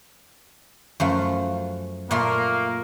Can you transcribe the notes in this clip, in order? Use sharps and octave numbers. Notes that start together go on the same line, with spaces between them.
F#2 F3 A3
A#2 A3 A#3 C6